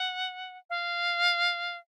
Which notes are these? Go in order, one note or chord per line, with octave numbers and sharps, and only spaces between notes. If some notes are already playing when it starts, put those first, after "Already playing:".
Already playing: F#5
F5